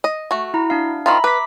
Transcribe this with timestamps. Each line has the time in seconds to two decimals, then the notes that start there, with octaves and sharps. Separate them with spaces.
0.04 D#5
0.31 A3 F#4
0.54 E4 A#5
0.70 D4 F5
1.06 D#3 F3 F4 E5 A#5 B5
1.24 B4 D6 B6